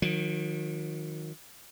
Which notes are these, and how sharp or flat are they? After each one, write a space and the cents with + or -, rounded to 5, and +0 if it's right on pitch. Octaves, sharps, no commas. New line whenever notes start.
D#3 +0 F#3 -40